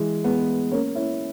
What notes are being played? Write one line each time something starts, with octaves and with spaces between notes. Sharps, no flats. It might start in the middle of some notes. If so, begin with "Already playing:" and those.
Already playing: E3 G#3
G#3 B3
A#3 C#4
C#4 E4